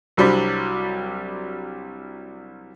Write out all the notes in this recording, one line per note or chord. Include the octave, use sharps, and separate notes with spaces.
C2 F#3 G3 C4 D4 B5